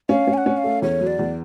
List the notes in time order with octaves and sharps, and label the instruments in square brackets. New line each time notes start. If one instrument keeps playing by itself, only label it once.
[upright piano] C#4 [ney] F5
[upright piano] C#4
[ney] G#5
F#5
[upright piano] C#4
[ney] F5
[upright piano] A3
[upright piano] E2 [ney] C#5
[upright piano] F#3
[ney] D5
[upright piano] E2